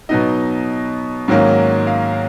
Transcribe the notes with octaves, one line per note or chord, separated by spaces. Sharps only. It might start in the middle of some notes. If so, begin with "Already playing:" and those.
B2 F#3 B3 D#4 D#5
G#2 D#3 F#3 A#3 C#4
F5